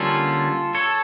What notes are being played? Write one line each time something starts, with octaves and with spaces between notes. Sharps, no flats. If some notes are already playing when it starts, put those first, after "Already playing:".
Already playing: D3 G3 A#3 C#4 F4 A4
A4 C#5